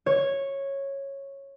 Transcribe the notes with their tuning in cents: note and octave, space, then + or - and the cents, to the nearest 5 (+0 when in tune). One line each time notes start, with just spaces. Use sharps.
C#5 -10